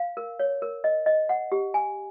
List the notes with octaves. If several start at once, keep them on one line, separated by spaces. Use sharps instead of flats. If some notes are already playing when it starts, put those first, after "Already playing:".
Already playing: F5
A#4
C#5
A#4
D#5
D#5
F#5
G4
G#5